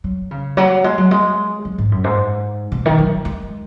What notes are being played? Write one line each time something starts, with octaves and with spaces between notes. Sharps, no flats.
F#3
C#3
F#3
G#3
F#3
G#3
F#3
G#2
F#2
G#2
B2
D#3
F#3
G#3